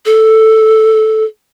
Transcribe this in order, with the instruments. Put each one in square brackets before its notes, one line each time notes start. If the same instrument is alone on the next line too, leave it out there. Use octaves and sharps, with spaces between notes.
[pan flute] A4